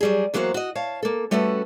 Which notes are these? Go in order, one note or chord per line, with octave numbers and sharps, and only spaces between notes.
F#3 G3 G#4
E2 F#3 A#3 F#4 C5 F#5
F#4 D#5
C#5 F5 A5
A#3 A4
G3 A3 C#4 F#4 A4 B4